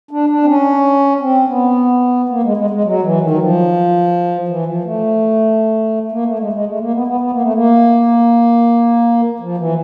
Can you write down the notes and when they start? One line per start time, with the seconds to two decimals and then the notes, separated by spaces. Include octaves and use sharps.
0.11 D4
0.30 D4
0.43 C4
0.48 C#4
1.20 C4
1.48 B3
2.29 A#3
2.43 G#3
2.57 G#3
2.70 G#3
2.84 F#3
3.03 E3
3.21 D#3
3.31 F#3
3.39 F3
4.48 E3
4.66 F3
4.84 A3
6.12 A#3
6.26 A3
6.39 G#3
6.53 G#3
6.66 A3
6.80 A#3
6.94 B3
7.07 B3
7.21 B3
7.32 A#3
7.42 A3
7.53 A#3
9.40 F3
9.58 E3